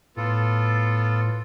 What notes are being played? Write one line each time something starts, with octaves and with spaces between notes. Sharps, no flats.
A2 B3 F4 A4